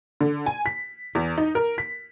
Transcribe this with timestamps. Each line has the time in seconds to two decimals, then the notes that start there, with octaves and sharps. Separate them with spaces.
0.21 D3
0.46 G#5
0.66 B6
1.15 E2
1.38 D#4
1.55 A#4
1.78 B6